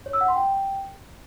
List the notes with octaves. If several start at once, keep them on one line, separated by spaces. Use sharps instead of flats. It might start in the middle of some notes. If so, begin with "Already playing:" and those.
C#5
E6
F#5
C6
G5